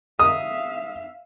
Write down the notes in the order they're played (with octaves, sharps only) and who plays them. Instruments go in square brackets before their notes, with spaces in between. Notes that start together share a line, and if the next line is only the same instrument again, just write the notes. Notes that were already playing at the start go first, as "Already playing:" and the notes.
[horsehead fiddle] E5 F5 [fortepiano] D#6